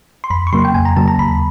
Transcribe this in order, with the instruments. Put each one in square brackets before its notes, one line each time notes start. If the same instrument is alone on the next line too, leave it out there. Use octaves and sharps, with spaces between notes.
[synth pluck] C6
F2 B5
C#6
C#3 F#3 A#3 C6
G5
F2 G#5
A#5
C#3 F#3 A#3 A5
A#5
D#2 B5